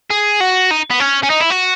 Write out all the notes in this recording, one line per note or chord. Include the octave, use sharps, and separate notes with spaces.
G#4
F#4
D#4
B3
C#4
C#4
D#4
E4
F#4